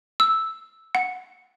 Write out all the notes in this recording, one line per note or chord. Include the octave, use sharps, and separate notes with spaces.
E6
F#5